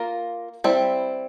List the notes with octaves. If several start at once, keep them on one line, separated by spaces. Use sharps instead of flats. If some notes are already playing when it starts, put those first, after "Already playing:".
Already playing: A#3 F4 A#4
G3 C4 E4